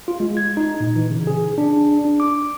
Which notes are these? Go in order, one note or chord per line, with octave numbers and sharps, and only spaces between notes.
F4
G#3
G#6
D#4
A#2
E3
C#3
G#4
D4
D4
D6